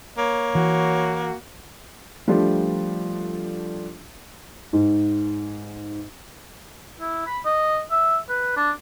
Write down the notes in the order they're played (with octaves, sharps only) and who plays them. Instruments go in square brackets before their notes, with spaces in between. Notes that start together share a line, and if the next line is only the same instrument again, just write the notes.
[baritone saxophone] A#3 [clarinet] C#5
[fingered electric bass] E3 [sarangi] F#4
[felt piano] F3 G3 A3 D4 F4 G4
G#2
[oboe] E4
B5
D#5
E5
B4
D4